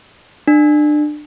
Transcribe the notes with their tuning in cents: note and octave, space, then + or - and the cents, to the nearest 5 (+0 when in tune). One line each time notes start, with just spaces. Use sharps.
D4 +30